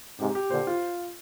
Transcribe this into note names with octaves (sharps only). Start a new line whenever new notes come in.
G#2 C3 G4
G4
A#2 D3 C5
F4